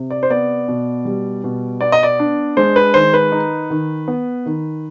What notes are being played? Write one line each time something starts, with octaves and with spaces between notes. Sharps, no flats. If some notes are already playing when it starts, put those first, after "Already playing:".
Already playing: C3
D5
C5
B3 D5
B2
G3
B2
B3 D5
D#5
D5
D4
G#3 C5
B4
D#3 C5
B4
D#4
D#3
B3
D#3